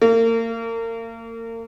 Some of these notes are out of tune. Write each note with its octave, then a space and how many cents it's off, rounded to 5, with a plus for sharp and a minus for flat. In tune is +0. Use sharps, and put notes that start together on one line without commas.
A#3 -35